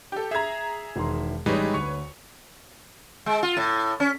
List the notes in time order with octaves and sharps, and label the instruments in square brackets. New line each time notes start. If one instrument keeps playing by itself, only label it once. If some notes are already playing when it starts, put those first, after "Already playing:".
[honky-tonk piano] G4 A4
[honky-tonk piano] G#4 A#5 [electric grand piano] E5 G#6
[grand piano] E1 D#3 C6
[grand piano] A1 [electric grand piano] G3 G#3 D#4 [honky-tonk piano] B4 C#5
[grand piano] D2 F7 [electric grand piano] C#6
[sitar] G#3
F4
A2
C#4